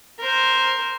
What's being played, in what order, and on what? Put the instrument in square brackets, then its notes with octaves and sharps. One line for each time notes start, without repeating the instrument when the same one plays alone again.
[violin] A#4 C5